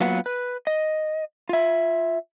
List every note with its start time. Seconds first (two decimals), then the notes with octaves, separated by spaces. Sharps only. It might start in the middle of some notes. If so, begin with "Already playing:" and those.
0.01 F#3 A#3 B3 F4 B4 F#5
0.26 B4
0.67 D#5
1.49 F4 E5